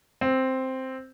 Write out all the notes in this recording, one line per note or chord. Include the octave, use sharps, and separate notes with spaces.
C4